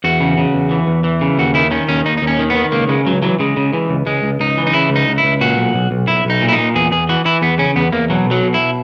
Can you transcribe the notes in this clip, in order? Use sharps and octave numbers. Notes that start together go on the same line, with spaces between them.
E2 F#4
C#3
C#3
E2
E3
E2
E3
C#3
D#2 F#4
D#3 E4
D#3 C#4
D#2 C#4
D#2 D#4
D#4
D#2
C#4
D#3
B3
D#3
C#2 A#3
C#3 G#3
C#2 F#3
E3 F#3
C#3 G#3
C#3
E3
C#2
C#2 G#3
C#2
C#2 D#4
E3
D#4
C#3 E4
C#2
D#4
C#2
E4
C#2
A#2 F#4
B1
B1
B1
B1 E4
B1 D#4
A#2
E4
D#4
A#2
E2 G#4
E2 G#4
E3 F#4
E3 E4
E2 B3
C#3 C#4
E2 B3
E2 A#3
B2 F#3
B1
F#3
B2
E4